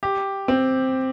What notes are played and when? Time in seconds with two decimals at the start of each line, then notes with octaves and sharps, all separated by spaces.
0.03 G4
0.48 C4